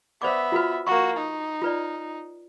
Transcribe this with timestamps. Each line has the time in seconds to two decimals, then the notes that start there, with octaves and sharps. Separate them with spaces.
0.22 B3 C5 D5 E5 D6
0.52 F4 F#4 B4
0.87 A#3 F#4 C#6
1.16 D#4
1.62 F4 B4 D5